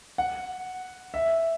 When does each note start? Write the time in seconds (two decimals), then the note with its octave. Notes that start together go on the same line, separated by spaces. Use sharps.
0.18 F#5
1.14 E5